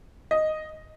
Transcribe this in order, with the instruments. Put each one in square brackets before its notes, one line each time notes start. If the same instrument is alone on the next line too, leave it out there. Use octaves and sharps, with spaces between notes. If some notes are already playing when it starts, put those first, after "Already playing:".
[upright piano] D#5